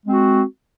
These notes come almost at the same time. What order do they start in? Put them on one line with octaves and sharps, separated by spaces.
G#3 C4 F#4